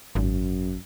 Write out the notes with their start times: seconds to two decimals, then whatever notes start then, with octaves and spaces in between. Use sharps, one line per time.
0.15 G#1 F#2